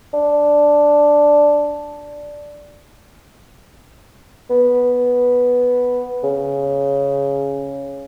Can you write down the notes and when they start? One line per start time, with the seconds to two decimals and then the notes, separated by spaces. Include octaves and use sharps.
0.14 D4
4.50 B3
6.24 C#3